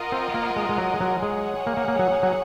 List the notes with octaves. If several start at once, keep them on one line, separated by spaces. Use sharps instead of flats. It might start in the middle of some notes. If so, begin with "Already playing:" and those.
Already playing: F4 A#4 D#5 F#5
C4
A#3
G#3
G#3
F#3
G#3
F#3
G#3 G#4 C#5 F#5
A#3
A#3
A#3
F#3
F#3